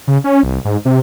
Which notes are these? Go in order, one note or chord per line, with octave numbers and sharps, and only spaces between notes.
C#3
C#4
C2
G#2
C3